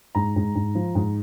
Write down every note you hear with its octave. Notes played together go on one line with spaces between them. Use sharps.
G#2 A#5
G#2
G#2
F3
G#2